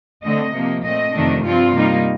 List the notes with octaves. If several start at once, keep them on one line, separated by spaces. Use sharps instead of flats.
D3 A3 C4 D#5
C3 F3 A#3
A#2 A3 C4 D#5
F2 C3 D#3 A3 D4
G2 F3 C4 F4
C3 G3 A#3 D#4